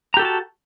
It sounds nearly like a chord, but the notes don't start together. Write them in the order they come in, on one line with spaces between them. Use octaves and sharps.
A#5 G4 A4 F#4 A5